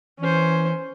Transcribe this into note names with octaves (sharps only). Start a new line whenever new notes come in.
E3 C#4 C5